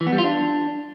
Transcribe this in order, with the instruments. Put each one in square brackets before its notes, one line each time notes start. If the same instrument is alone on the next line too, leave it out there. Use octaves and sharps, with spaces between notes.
[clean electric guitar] E3
B3
G3
F4
D4